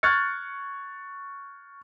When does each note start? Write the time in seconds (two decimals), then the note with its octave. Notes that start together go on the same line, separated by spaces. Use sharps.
0.03 C#6 F6 F#6 G#6 A6 C#7